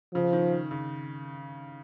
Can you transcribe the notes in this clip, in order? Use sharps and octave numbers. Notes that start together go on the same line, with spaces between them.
C#3 F3
D#3
D#3
C#3